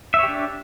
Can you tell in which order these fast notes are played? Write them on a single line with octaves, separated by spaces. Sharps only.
E5 C#5 G4 D4